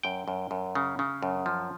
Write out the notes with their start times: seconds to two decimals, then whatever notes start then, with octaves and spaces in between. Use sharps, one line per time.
0.03 F#2 G5
0.28 F#2
0.51 F#2
0.75 C#3
0.99 C#3
1.23 F#2
1.46 F3